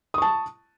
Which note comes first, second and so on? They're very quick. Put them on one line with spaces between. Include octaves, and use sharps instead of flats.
D#6 C#6 A5